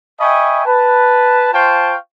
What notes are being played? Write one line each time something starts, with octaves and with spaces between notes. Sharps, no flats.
D#5 E5 G5 G#5 B5 C#6
B4 A5
F4 C5 F5 G5 A5 C#6